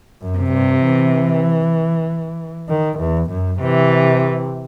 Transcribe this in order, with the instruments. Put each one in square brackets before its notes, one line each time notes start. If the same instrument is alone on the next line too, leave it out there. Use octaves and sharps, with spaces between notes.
[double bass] F#2
[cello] C3
[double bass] G2
E3
D#3
E2
F#2
[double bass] C3 [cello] E3